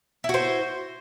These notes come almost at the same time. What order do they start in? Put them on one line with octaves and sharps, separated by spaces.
E4 F#4 C5